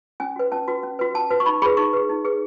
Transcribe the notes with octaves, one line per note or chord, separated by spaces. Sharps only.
C#4 G#5
F#4 B4
C#4 A5
F#4 B4
C#4
F#4 B4
C#4 A5
F#4 B4
C#6
D#4 B5
G#4 B4 B5
D#4 C#6
G#4 B4
D#4
G#4 B4